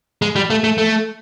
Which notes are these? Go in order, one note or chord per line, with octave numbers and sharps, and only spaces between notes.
G#3
G3
A3
A3
A3